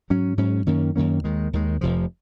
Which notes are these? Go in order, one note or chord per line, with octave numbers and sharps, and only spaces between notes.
G#2 F#3 C#4
G#2 F#3 C#4
F#2 D#3 A#3 C#4
F#2 D#3 A#3 C#4
D#2 D#3 G#3
D#2 D#3 G#3
F1 F2 C3 F3